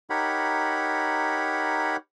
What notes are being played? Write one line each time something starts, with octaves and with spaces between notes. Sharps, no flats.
D#4 G4 A#4 C#5 F#5 B5